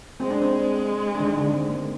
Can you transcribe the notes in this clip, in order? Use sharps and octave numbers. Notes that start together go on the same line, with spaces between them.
G#3 C4
D4
C4
D4
D#3 D#4
D3 D4
C4
A#3